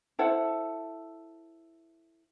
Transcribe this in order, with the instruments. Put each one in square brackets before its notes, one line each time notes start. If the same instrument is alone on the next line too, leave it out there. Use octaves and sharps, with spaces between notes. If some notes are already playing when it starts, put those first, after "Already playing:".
[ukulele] E4 A4 C5 F#5